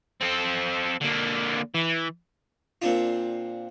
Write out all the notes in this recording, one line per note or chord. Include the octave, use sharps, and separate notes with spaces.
C4 A4
D3 A#3
E3
A#2 C4 D4 F4